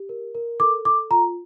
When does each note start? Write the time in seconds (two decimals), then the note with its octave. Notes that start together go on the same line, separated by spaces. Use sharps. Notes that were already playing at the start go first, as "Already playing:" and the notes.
Already playing: G4
0.09 A#4
0.35 A#4
0.60 A4 D6
0.85 A4 D6
1.10 F4 A#5